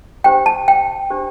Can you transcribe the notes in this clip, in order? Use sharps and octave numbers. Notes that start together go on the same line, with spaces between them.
D4 G4 C5 G5
A5
G5
D4 G4 C5